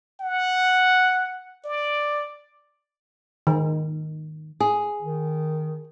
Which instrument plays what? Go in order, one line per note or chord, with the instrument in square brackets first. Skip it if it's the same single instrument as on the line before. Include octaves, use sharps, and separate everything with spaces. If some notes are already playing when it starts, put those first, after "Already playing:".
[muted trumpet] F#5
D5
[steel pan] D#3
[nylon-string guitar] G#4
[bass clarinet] D#3